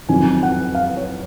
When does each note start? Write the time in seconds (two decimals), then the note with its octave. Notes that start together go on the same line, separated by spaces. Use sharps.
0.09 F2 D#3 F#3 G#5
0.43 F#5
0.75 F5
0.97 C#5